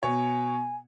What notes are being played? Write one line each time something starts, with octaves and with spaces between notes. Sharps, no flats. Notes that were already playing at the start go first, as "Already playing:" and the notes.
B2 C#5 G#5